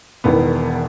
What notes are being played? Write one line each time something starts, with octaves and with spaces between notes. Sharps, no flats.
E1 E2 D#3 B3